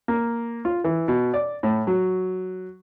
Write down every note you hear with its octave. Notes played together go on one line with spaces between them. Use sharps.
A#3
F4
E3
B2
D5
A2
F#3